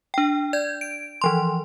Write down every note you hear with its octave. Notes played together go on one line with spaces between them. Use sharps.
D4 G5
D5 G6 G#6
D7
E3 F3 C6